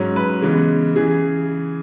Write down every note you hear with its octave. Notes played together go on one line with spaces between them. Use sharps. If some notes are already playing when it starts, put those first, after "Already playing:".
Already playing: G#2 F#3 C#4
B4
C#3 E3 G#3 B3
C#3 E3 G#4